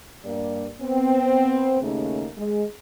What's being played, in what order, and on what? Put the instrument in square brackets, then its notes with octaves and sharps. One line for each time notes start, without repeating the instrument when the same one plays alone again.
[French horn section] G2 A#3 D5
B3 C4
D#2 C#3 A3 A#3 C#4 D#4
G#3